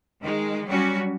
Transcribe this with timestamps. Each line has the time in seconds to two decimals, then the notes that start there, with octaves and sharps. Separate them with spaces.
0.21 D#3 G#3
0.65 F#3 G3 C#4 F#4